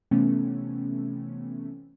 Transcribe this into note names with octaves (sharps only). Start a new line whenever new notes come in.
C3 E3 A3 B3 C#4